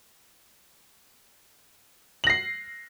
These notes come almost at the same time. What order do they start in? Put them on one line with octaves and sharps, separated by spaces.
F#7 A#6 C7